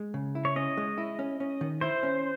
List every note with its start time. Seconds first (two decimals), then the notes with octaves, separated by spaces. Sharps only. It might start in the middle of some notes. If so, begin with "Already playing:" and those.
Already playing: G#3
0.14 C#3
0.35 E4
0.45 C#5
0.56 C#4 D#5
0.77 G#3
0.98 E4
1.19 C#4
1.40 C#4
1.61 D#3
1.81 E4 C5
2.03 C#4